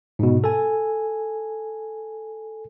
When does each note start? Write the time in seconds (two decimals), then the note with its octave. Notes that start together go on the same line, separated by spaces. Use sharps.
0.19 G#2 B2
0.44 A4 G#5